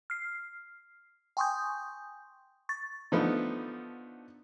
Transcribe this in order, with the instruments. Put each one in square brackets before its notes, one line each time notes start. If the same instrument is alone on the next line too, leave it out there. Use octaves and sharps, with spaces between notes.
[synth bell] F6 C7
G5 G#5 C6 C#6 D#6 G6
C#6 A6
[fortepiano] D3 F3 A3 B3 D#4